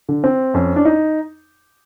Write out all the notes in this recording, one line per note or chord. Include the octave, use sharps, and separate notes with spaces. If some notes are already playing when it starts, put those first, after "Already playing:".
D3
C4
F2 C#4
D4
D#4